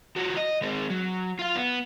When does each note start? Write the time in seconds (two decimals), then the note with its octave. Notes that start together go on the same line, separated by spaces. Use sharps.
0.16 F3 F#4
0.37 D#5
0.62 G#3 C4
0.90 F#3
1.39 F4 F5
1.55 B3